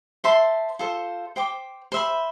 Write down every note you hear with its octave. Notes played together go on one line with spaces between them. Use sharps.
C5 E5 A5 C6
F4 A4 C5
C5 G5 D6
C5 E5 B5